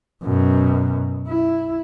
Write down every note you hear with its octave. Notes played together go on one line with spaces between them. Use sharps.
F#2 B2
E4